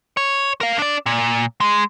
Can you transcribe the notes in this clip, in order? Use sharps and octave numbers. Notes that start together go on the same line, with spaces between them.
C#5
A#4 F5
D4 D5
A#2
G#3